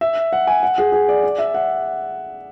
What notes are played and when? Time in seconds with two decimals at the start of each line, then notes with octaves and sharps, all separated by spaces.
0.01 E5
0.33 F#5
0.47 G#5
0.63 F#5
0.78 G#4
0.92 G#4
1.09 D5
1.24 D5
1.39 E5
1.54 F#5